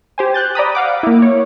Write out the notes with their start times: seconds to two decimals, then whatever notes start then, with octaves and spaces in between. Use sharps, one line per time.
0.18 G4 C5 G#5
0.34 F#6 G6 A6
0.55 D5 A#5 B5 D#6
0.75 F5 F#5 D6
1.03 A#3 E4
1.22 C#5